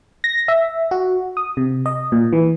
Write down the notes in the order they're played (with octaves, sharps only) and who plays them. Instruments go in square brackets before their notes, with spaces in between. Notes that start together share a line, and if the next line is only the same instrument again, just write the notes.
[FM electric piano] A#6
E5
F#4
D#6
C3
D#5
A#2
E3